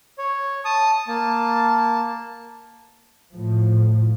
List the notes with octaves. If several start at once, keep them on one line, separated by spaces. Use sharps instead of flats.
C#5
A5 D#6
A#3 A5
A2 F3